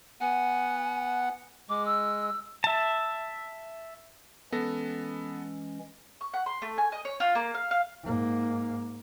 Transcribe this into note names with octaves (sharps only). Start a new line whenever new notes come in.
B3 F#5 G#5
G#3 D6
E6
E5 A5
E3 G#3 B3 C#4 A4 A#6
C#6
F#5
C6
A3
G#5
D#5
C#5
F4
A#3
F5
F5
G#2 A#3